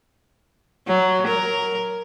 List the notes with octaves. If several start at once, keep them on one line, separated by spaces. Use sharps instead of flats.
F#3
A#4